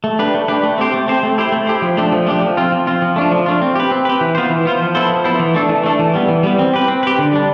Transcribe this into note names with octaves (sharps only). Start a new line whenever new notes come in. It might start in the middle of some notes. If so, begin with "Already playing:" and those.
A3
D4 G4 B4
A3
D4 G4 B4
A3
C4 G4 C5
A3
C4 G4 C5
A3
E4 G4 C5
A3
E4 G4 C5
F3
A3 D4 G4
F3
A3 D4 G4
F3
C4 F4
F3
C4 F4
F3
A3 D4 F4
F3
A3 D4 F4
C4
G4 B4
C4
G4 B4
E3
B3 F4 C5
E3
B3 F4 C5
F3
B3 E4 A4 C5
F3
B3 E4 A4 C5
E3
A3 D4 A4
E3
A3 D4 A4
E3
G3 B3
E3
G3 B3
C4
G4 B4
C4
G4 B4
D3
G3 D4